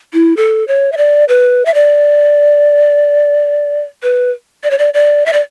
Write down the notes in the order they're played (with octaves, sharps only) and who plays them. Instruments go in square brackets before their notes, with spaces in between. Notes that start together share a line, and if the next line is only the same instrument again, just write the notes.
[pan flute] E4
A4
C#5
E5
D5
B4
E5
D5
B4
D5
C#5
D5
D5
E5
D5